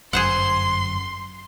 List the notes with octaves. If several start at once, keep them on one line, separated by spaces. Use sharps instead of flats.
G1 F#2 G#4 C5 F#5 C6